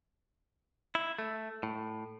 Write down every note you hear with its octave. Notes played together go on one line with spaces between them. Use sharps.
E4
A3
A2